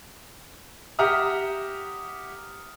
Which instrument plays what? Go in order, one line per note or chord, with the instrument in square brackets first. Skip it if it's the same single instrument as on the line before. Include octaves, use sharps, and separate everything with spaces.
[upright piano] G4 E5 F#5 A#5 D#6 F6